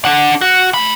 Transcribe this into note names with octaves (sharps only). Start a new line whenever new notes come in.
D4 F#5
F#4
A3 B5